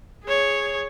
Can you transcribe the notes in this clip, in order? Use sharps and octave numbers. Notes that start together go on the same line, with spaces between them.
G#4 C#5